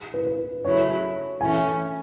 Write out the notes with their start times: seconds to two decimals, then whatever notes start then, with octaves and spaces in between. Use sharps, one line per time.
0.14 B4
0.27 B4
0.65 C#3 F#3 A3 E4 C#5
1.41 E3 A3 C#4 G#5